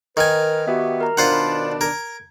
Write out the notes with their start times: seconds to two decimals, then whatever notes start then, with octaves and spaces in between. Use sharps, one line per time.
0.17 D#3 A#4 B4 G#5
0.68 B3 F#4 G4 E5
1.01 A#4 A#5
1.17 B2 D#3 D4 F4 C5 F#5
1.32 B5
1.81 A#4 G#6